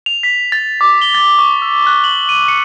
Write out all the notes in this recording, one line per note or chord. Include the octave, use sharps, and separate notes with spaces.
F7
B6
A6
D6
G7
A6
C#6
E6
F#6
F#7
D#7
C#7